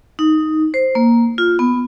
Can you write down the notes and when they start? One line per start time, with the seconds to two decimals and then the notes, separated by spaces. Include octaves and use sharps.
0.19 D#4
0.74 C5
0.95 A#3
1.38 F4
1.59 B3